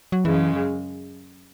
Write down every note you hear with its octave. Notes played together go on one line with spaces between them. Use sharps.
F#3
F#2 C#3 E3 G#3